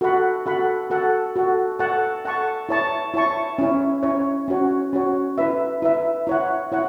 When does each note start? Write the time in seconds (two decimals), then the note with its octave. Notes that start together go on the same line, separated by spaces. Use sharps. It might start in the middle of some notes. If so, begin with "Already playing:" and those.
0.01 F#4 A4 F#5 B5
0.46 F#4 A4 F#5 B5
0.90 F#4 A4 F#5
1.36 F#4 A4 F#5
1.79 A4 F#5 A5 C#6
2.25 A4 F#5 A5 C#6
2.69 E4 C#5 A5 C#6
3.14 E4 C#5 A5 C#6
3.58 C#4 E4 C#5
4.03 C#4 E4 C#5
4.48 C#4 F#4 C#5
4.93 C#4 F#4 C#5
5.38 E4 B4 E5
5.82 E4 B4 E5
6.27 E4 C#5 F#5
6.72 E4 C#5 F#5